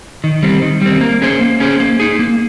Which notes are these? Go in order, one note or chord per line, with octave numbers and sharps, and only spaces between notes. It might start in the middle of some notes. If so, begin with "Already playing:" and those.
D#3
G3 C4
D#3
G3 C4
A#3
C#4 G#4 C5
A#3
C#4 G#4 C5
A#3
D#4 G#4
A#3